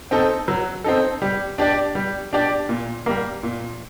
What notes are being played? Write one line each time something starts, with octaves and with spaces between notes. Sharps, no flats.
C4 D#4 A4
F#3
C4 D#4 A4
G3
D4 G4 D5
G3
D4 G4 D5
A#2
G3 A#3
A#2